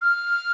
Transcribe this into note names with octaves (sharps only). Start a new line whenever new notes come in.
F6